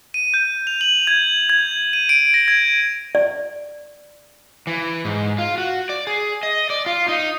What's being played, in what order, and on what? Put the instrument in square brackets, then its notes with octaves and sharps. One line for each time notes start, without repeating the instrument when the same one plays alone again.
[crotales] D#7
G6
F7
F#7
G#6
G#6
D#7
D7
A#6
G#6
[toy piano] D5
[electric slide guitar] E3
G#2
F4
F#4
D5
G#4
D#5
D5
F4
D#4